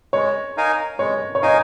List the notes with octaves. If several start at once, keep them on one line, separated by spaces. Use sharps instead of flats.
G#3 C#5
D#4 A#4 F5 G#5
G#3 C#5
C#5
D#4 A#4 D#5 F5 G#5